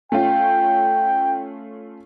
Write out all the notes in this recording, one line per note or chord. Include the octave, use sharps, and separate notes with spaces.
A3 C#4 F4 G5